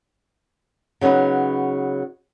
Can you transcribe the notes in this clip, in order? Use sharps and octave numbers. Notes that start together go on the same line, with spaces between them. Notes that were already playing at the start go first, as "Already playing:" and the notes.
C#3 F#3 B3 D#4 B4